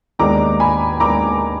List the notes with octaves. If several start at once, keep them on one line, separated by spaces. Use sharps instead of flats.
D#2 D#3 G#3 B3 D4 A#5 D6
G#5 B5
D#2 D#3 G#3 B3 D4 A#5 D6